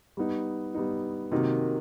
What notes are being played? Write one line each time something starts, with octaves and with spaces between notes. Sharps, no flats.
G3 B3 D#4
G3 B3 D#4
C3 D#3 F#3 A#3 D#4